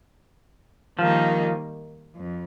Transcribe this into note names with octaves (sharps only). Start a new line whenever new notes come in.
D#3 F3 G3 A#3 D#4
F2